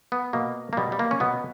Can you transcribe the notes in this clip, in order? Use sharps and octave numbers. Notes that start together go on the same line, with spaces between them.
B3
B2 A#3
A#3
B2 G3
G3
A#3
C#4
B2 B3